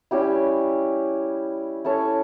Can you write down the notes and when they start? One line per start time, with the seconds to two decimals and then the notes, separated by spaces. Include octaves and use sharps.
0.11 G3 C#4 E4 G4
1.85 C#4 E4 A4 C#5